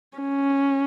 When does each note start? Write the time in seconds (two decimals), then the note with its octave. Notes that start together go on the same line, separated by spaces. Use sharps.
0.18 C#4